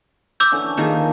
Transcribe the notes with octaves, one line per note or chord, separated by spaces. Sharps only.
D6 E6 G6
D3 E3 C#4
D#3 F3 A#3 D#4 G#4 A4